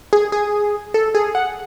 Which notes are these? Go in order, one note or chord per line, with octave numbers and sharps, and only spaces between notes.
G#4
G#4
A4
G#4
F#5